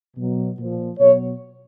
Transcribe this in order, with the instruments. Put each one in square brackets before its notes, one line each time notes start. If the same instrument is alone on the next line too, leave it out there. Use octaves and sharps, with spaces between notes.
[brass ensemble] B2 F#3
A#2 F3
B2 F#3 C#5